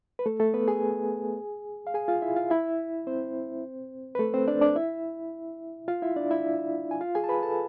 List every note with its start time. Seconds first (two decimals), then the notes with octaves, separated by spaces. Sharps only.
0.19 B4
0.26 A3 A4
0.40 A3 A4
0.54 B3 B4
0.68 G#4 G#5
1.87 F5
1.94 G#4 G#5
2.08 F4 F5
2.22 E4 E5
2.36 F4 F5
2.50 E4 E5
3.07 C4 C5
4.15 B4
4.19 A3 A4
4.34 C4 C5
4.48 D4 D5
4.61 D4 D5
4.76 E4 E5
5.88 F4 F5
6.02 E4 E5
6.16 D4 D5
6.31 E4 E5
6.91 G#5
7.01 F4 F5
7.15 G#4 G#5
7.24 A5
7.29 B4 B5
7.43 A4 A5